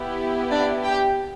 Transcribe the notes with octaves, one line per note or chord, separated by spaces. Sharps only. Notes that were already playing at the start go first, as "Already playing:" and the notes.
Already playing: B3 E4 G4
D4 D5
G4 G5